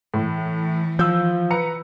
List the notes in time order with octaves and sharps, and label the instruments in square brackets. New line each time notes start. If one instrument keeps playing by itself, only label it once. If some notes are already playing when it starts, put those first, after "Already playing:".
[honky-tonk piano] A2 [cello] E3
[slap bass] F3 [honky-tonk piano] E6 G6
[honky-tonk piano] B4 A#5 C#7